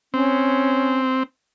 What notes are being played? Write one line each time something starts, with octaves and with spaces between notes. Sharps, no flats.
C4 C#4